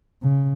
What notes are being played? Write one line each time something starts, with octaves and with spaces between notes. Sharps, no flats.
C#3